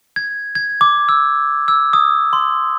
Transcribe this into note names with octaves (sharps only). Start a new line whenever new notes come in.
G#6
G#6
D6
E6
E6
D#6
C6